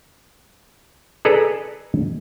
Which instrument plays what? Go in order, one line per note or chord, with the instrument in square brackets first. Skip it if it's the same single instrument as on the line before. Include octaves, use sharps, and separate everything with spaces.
[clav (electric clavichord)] G#4 A4 B4 D5 A#5